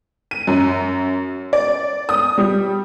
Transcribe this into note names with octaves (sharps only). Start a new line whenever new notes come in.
D#7
F#2
D5
D#6
G3